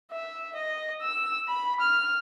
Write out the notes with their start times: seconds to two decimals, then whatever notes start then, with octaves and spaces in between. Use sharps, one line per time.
0.11 E5
0.55 D#5
1.02 E6
1.48 B5
1.80 F6